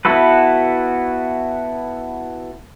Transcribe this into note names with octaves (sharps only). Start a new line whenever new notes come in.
B3 E4 F#4 A4 B4